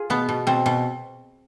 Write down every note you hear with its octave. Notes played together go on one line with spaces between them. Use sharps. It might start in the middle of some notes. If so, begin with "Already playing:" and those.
Already playing: F4 G#4
B2 B3
B2
B2 C4
B2